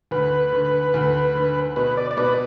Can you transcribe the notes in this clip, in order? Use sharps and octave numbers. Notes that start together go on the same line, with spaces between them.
D2 B4
D3
D2
D3
B2 B4
D5
D5
B2 B4